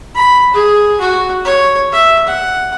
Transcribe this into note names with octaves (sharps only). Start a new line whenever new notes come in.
B5
G#4
F#4
C#5
E5
F#5